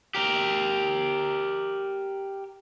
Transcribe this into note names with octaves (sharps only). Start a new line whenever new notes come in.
G4 A#4